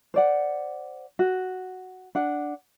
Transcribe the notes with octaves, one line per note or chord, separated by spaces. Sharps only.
C5 D5 F#5
F#4
D4 F#5